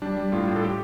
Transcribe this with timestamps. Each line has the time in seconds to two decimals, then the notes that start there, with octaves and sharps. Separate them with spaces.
0.02 G3 D4
0.17 G3
0.32 A2 F4
0.48 A2
0.56 A4
0.64 G4